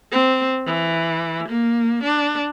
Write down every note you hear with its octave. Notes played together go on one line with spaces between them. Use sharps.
C4
E3
A#3
D4